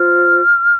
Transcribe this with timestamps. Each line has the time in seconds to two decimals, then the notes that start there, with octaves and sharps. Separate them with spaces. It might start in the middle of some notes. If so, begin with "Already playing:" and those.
Already playing: F4 C5 F6